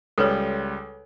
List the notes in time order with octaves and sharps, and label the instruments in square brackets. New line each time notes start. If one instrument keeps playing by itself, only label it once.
[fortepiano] C#2 G3 [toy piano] A4 B4 C#5